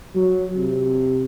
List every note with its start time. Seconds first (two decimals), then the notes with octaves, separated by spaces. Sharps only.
0.15 F#3
0.57 C3